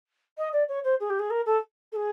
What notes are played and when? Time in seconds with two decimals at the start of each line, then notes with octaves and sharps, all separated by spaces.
0.38 D#5
0.52 D5
0.68 C#5
0.84 C5
1.00 G#4
1.09 G4
1.19 G#4
1.30 A#4
1.45 A4
1.92 A4
1.96 G#4